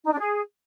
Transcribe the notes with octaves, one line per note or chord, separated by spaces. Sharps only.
D#4
D4
G#4